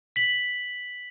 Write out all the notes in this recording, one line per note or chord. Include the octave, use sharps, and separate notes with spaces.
B6 F#7